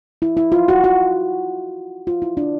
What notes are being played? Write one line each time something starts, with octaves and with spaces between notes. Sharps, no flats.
E4
E4
F4
F#4
F#4
F4
E4
D4